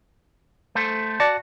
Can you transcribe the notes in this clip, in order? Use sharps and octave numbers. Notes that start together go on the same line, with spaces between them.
A3 A4 C5
F#4 D5 A5